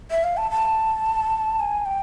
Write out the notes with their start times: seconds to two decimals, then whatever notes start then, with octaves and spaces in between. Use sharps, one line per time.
0.11 E5
0.24 F5
0.37 A5
0.51 A5
1.60 G#5
1.86 G5